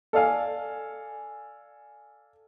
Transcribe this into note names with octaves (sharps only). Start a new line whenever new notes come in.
A4 D5 F5 G#5